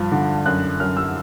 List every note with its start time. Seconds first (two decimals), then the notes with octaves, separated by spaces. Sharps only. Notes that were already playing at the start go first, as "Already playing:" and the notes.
Already playing: G2 F3
0.12 D3
0.46 F#2 F#6
0.80 F#2 F6
0.97 E6